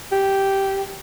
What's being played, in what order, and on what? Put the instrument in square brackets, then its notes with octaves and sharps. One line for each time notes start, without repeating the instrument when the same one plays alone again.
[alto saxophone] G4